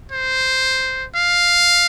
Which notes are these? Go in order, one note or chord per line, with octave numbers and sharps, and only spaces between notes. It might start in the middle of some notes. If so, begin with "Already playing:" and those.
C5
F5